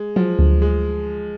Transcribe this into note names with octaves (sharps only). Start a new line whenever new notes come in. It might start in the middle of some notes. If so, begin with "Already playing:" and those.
Already playing: G#3
F3 F#3
D2
G#3